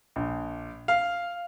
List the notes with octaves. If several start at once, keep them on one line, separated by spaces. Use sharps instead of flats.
A#1
F5